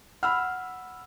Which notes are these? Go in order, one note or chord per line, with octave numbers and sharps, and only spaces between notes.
F#5 B5 E6 F6